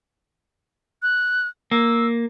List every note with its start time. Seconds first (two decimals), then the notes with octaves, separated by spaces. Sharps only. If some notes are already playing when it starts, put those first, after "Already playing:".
1.02 F#6
1.71 A#3 E6